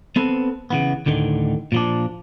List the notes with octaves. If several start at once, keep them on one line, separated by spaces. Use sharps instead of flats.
B3 C4 A4 B4
C#3 E3 B3
D2 A2 D3 D#3
A#2 F3 D4